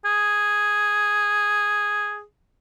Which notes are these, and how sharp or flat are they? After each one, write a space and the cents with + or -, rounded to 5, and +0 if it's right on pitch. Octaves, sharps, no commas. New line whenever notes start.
G#4 +0